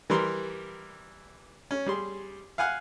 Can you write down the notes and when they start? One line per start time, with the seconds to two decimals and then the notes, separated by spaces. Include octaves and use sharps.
0.10 E3 G3 A#4 C6
1.71 C#4
1.86 G3 G#4 C6
2.58 F5 F#5 G#5 F6 F#6